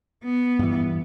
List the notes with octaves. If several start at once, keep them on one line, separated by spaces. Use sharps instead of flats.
B3
G2 E3